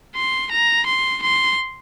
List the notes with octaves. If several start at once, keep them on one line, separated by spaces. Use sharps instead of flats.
C6
A#5
C6
C6